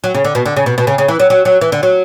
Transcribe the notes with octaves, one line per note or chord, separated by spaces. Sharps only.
F#3
C#3
D3
B2
D3
C#3
B2
B2
C#3
C#3
E3
F#3
F#3
F#3
E3
D3
F#3